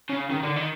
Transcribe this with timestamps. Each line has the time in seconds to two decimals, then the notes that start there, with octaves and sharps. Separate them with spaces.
0.10 C#3
0.30 D#3
0.43 D3
0.56 D#3